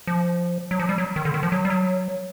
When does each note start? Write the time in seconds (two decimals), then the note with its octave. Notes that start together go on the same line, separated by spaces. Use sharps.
0.07 F3
0.71 F#3
0.79 F3
0.89 G3
0.98 F#3
1.16 D#3
1.25 D3
1.34 D#3
1.43 F3
1.52 F#3
1.65 G3
1.70 F#3